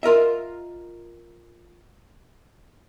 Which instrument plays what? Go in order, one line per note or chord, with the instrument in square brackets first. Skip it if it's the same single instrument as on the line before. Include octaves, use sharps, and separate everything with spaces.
[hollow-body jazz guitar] F4 A#4 D#5 E5